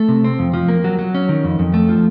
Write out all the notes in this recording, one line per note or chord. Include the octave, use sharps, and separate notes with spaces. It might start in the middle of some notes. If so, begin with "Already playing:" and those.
Already playing: A3
C3
C4
F2
F3
A#3
F#3
F#3
C#4
D#3
F2
F2
A3
F3